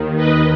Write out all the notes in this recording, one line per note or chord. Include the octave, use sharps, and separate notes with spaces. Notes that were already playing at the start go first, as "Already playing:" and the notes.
Already playing: D#2 D#3
B4 D#5